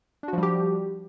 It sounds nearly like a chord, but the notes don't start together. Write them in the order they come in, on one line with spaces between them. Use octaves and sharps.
D4 F#4 F3 G3 G4